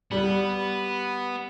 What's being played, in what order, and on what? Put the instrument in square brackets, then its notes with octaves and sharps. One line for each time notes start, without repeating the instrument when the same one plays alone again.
[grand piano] G3 [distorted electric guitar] B3